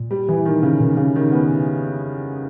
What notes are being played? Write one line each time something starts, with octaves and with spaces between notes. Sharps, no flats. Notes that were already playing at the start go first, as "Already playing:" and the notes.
Already playing: A#2
G3
E3
D#3
C#3
B2 D#3
C#3
D#3
B3